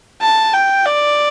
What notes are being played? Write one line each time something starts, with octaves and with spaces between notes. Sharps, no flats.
A5
G5
D5